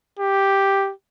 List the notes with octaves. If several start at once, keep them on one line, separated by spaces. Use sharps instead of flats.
G4